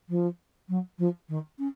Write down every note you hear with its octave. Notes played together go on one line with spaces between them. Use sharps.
F3
F#3
F3
D#3
C#4